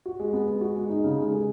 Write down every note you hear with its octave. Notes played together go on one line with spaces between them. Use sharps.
F#4
G#3
B3
G#3
F#4
G#3
D#4
C#3
G#3
G#4